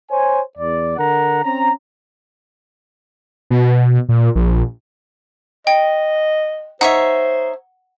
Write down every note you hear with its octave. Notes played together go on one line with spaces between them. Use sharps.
C5 C#5 G#5
E2 D5
D3 A#4 F#5 A#5
C4 C#4 A#5
B2
A#2
A#1
D#5 G5
D#4 C5 C#5 E5 F#5